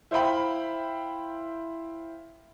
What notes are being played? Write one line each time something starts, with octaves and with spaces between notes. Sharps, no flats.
E4 C5 F5 G5 B5